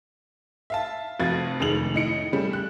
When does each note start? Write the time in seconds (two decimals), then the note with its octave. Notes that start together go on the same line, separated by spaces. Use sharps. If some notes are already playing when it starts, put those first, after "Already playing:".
0.70 E5 F5 A5
1.19 F1 F2 F#4 F5 G#6 A6
1.60 F1 D#3 G#3 F7 F#7
1.94 A2 D#4 C#7 D7
2.33 C#3 G3 A3 C#4
2.53 F#6